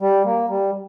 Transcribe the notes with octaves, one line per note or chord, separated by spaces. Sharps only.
G3
A#3
G3